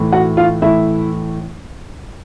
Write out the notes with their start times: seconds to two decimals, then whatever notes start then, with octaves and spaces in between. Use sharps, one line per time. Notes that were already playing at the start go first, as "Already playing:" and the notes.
Already playing: A2 E3 A3
0.12 F#4 F#5
0.37 F4 F5
0.62 A2 E3 A3 E4 E5